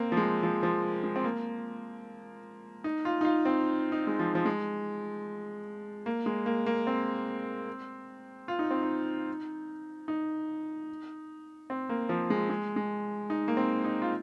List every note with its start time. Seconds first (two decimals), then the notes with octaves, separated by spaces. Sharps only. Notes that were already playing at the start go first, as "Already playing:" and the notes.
Already playing: A#3 C4
0.12 F3
0.17 G#3
0.43 F3
0.63 F3
1.04 G#3
1.16 C4
1.24 A#3
2.84 D#4
3.05 F4
3.21 D#4
3.25 F4
3.46 C4
3.92 D#4
4.07 G#3
4.19 F3
4.35 F3
4.45 G#3
6.06 A#3
6.26 G#3
6.46 A#3
6.66 A#3
6.87 C4
8.48 F4
8.59 D#4
8.71 C4
8.83 D#4
10.08 D#4
11.70 C4
11.89 A#3
12.09 F3
12.30 G#3
12.50 G#3
12.76 G#3
13.30 D#4
13.48 A#3
13.57 C4
13.84 D#4
14.02 F4